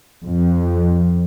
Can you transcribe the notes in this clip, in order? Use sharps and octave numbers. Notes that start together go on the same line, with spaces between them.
F2